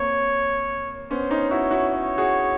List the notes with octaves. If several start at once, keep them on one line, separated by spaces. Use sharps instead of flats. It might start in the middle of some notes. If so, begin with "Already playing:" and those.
Already playing: A#3 C4 C#5
B3 C#4 C5
C#4 D#4
E4 F#4 C#5
E4 F#4
C#5
F#4 G#4